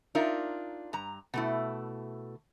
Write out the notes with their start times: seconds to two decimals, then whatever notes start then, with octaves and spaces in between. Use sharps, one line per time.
0.15 D4 D#4 F4 A#4 E5
0.93 G2 A#5
1.34 B2 A3 E4